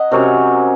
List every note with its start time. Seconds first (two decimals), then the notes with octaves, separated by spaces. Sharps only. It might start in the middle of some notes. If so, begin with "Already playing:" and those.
Already playing: D#5 F#5 G#5 A#5
0.11 C3 F#3 C#4 A#4 C#5